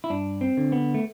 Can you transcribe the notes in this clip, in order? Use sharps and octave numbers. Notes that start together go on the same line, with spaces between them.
E4
G2 D4
C4
D3
B3
A3